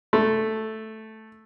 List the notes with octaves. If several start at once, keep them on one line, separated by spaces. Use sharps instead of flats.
A3